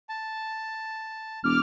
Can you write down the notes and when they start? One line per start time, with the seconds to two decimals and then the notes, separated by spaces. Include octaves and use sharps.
0.09 A5
1.44 E1 D6 F6